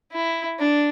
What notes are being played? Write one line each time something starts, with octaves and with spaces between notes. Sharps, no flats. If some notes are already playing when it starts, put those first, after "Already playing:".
E4
D4